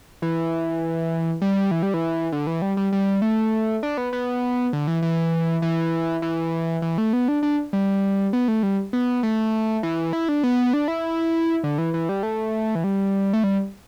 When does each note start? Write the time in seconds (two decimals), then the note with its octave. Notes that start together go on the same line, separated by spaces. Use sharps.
0.22 E3
1.42 G3
1.71 E3
1.83 G3
1.94 E3
2.32 D3
2.47 E3
2.62 G3
2.77 G3
2.92 G3
3.22 A3
3.83 D4
3.98 B3
4.13 B3
4.73 D3
4.87 E3
5.02 E3
5.62 E3
6.22 E3
6.82 E3
6.98 A3
7.13 B3
7.28 D4
7.43 D4
7.73 G3
8.33 B3
8.48 A3
8.63 G3
8.93 B3
9.23 A3
9.83 E3
10.13 E4
10.29 D4
10.43 B3
10.73 D4
10.88 E4
11.64 D3
11.78 E3
11.94 E3
12.09 G3
12.23 A3
12.75 E3
12.84 G3
13.33 A3
13.44 G3